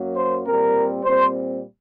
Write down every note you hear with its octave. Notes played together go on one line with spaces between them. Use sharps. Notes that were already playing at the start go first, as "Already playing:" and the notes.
Already playing: F#2 F#3 A#3
C5
A#2 G3 C4 A#4
A#2 G3 C4 C5